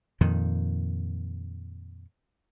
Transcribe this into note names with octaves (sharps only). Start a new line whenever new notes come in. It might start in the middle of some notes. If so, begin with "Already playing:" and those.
F2 A#2 D#3